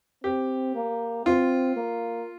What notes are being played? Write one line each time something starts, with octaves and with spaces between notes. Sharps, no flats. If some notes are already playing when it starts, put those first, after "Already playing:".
C4 G4
A#3
C4 F4
A#3